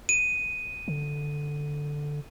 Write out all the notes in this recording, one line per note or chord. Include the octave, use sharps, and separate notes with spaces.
D#7
D3